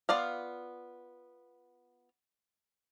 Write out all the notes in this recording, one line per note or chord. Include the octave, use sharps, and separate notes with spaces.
B3 F4 D5 F5